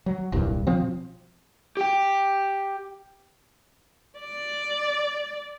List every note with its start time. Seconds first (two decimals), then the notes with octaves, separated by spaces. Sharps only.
0.06 F#3
0.32 D#1 C2 G2
0.67 B2 F3 C4
1.77 G4 G5
4.19 D5